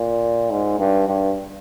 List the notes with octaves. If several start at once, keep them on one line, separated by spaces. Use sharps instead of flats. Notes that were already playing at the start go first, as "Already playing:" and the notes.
Already playing: A#2
G#2
G2
G2